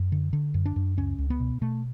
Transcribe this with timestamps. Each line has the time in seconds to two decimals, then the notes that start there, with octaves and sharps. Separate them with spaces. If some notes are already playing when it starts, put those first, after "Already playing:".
Already playing: F#2
0.12 D3
0.33 D3
0.54 F#2
0.66 D4
0.76 F#2
0.97 C#2 C#4
1.18 C#2
1.30 B3
1.40 B2
1.61 B2 A3